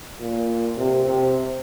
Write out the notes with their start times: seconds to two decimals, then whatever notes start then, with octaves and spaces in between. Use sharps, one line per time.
0.21 A#2
0.77 C3
1.05 C3